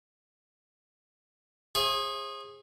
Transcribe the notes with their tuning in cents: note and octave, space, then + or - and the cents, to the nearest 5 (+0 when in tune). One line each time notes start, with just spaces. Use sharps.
G#4 -15 C5 +45 E5 +15